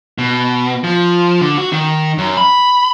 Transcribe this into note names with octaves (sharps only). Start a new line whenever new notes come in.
B2
F3
D3
F#4
D#3
F#2
B5